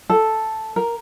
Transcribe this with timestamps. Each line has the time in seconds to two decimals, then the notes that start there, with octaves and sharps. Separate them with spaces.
0.10 A4
0.76 A#4